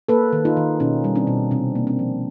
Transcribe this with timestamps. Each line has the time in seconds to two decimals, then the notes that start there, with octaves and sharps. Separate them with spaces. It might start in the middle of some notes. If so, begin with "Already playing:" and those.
0.09 A#3 A4 B4
0.33 D#3
0.45 D#4 F4
0.57 D#3
0.80 B2 C#4 D#4
1.04 G3
1.15 C4 D4
1.27 B2
1.51 C3 C4 D4
1.75 A#3
1.87 C4 D4
1.99 F3